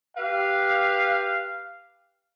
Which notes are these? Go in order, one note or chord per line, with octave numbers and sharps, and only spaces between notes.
G4 B4 F5